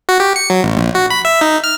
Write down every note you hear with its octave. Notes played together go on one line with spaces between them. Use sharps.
F#4
G4
C#7
F#3
A1
A#1
F#4
B5
E5
D#4
F6